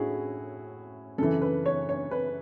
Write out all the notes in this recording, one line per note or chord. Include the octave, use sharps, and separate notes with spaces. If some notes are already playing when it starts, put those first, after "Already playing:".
Already playing: A2 C#4 E4 F#4 G#4
F#2 C#3 E3 A4
B4
C#5
C#5
B4